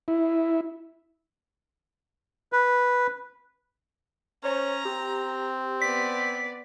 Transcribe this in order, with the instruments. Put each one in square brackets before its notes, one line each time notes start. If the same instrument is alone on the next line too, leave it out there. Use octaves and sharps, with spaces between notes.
[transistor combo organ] E4
[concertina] B4
[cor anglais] C#4 [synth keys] C5 C#5 [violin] A#5
[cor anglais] C4 [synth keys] G4
[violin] B3 D5 [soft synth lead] B6